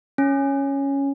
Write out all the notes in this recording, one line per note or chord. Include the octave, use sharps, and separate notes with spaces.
C#4